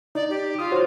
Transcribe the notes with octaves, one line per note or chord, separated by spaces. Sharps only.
D#4 D5
G4
F4 D#6
F#4 C5 C#5